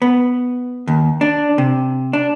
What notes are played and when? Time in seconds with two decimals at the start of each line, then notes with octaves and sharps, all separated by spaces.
0.02 B3
0.88 D#2
1.21 D4
1.58 C3
2.13 D4